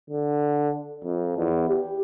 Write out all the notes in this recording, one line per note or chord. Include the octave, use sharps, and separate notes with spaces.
D3
F2
E2
G4